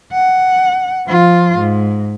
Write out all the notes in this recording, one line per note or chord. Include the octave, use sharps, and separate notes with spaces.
F#5
F3 F4
G#2